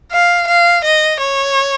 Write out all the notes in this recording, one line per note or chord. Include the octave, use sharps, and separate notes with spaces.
F5
F5
D#5
C#5